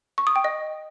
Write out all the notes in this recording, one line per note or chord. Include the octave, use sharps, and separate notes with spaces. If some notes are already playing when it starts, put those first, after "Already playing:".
C#6
D#6
G5
D#5